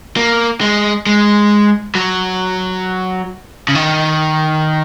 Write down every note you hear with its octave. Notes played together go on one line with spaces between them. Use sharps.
A#3
G#3
G#3
F#3
C#3
D#3